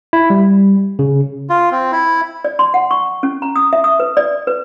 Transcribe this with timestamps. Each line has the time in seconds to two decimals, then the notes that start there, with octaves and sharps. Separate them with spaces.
0.13 E4
0.30 G3
0.99 C#3
1.50 F4
1.71 C4
1.92 E4
2.44 D5
2.59 C6
2.74 F#5
2.91 C#6
3.23 C#4
3.42 A#5
3.56 D#6
3.73 E5
3.84 D#6
4.00 B4
4.17 D5
4.47 B4